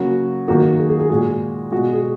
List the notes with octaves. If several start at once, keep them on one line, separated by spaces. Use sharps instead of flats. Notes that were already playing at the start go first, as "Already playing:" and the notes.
Already playing: C#3 F#3 A#3 F#4
D#3 F#3 A#3 F#4
G#4
G#4
G#4
A#2 G#3 F#4
B2 G#3 F#4
G#4